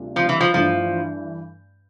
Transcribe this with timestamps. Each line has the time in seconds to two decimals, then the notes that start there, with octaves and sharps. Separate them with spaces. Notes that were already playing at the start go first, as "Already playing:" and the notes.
Already playing: D2 C3 G3 D4 F4
0.16 F3
0.29 E3
0.41 F3
0.53 G2 E3 F3 A3 D4